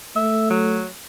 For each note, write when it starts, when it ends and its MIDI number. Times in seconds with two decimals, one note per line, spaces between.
0.16 0.84 57
0.16 0.46 76
0.50 0.88 54